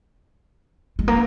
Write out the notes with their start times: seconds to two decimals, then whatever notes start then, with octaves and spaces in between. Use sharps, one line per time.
0.99 G#3
1.08 A#3